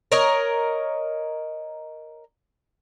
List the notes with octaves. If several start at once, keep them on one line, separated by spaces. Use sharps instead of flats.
A#4 C#5 D#5